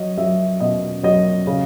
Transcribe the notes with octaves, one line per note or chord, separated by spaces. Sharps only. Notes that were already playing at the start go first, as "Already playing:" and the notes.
Already playing: F#3 D#5
F#3 E5
B2 D#5
F#3 D#5
C#3